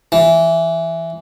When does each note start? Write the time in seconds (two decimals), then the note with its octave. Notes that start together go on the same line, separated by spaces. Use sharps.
0.12 E3